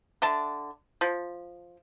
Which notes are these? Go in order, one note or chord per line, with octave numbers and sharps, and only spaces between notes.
D3 E5 A5
F3